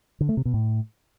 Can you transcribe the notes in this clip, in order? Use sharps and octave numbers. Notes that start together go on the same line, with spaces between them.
D3
A3
C3
B2
A2